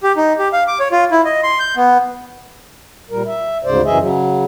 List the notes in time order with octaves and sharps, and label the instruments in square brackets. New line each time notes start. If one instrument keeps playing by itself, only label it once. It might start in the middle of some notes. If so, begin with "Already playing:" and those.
[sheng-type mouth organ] G4
D#4
G4
F5
D6
C#5
F4
E4
D#5
C6
G6
B3
[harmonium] A#2 G3 A#4
E5
D2 G#2 C#3 C5 D5
F#2 C#3 E3 G#4 D#5 E5
C#3 F#3